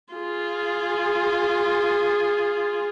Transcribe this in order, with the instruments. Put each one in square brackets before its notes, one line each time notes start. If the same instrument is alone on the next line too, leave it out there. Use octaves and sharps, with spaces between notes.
[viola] F4 G#4